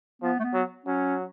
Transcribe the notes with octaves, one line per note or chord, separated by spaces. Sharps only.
F3 B3
A3
B3
F#3
F#3 C#4